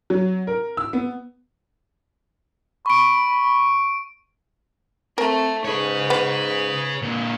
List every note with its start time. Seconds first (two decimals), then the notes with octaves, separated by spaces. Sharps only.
0.10 F#3
0.47 A#4
0.77 E6
0.93 B3
2.86 B5 C#6 D7
5.18 A3 C4 A#4
5.65 G#2 G#4 B4 C#5
6.10 B3
7.02 A#2 D3